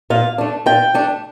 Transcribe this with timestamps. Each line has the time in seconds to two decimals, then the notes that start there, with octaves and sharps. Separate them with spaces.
0.10 A#2 F5
0.38 A3 D4
0.66 A#2 G5
0.94 A3 D4